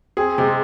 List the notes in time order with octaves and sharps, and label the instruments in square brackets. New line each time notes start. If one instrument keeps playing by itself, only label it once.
[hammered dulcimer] C4 [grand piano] G#4
[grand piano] C3 [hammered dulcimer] G#3